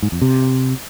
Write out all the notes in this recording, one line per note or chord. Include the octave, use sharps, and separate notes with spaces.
G#2
F2
C3